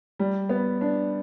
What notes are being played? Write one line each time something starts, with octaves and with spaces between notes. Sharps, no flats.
G3
B3
D4